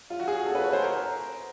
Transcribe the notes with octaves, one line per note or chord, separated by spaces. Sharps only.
F4
F#4
G#4
A4
B4
C#5
C5
A#4